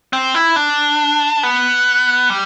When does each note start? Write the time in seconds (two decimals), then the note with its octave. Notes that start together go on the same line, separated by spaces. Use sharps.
0.13 C4
0.34 E4
0.56 D4
1.43 B3
2.30 G3